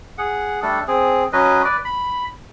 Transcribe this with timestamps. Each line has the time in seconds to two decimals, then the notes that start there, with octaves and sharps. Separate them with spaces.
0.18 G#4 F#5
0.62 G3 A3 D4 A4
0.88 C4 G#4
1.33 F#3 C#4 B4 D#5
1.65 B4 D5
1.85 B5